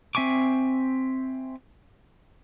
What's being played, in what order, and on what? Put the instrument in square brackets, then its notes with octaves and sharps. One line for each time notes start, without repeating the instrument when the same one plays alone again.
[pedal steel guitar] C4 E5 G#5 C#6 D6